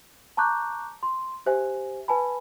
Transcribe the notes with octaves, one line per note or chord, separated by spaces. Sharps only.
A5 A#5 C#6 D6 F#6 G6
C6
G4 C5 E5 G#5
B4 G#5 A5 B5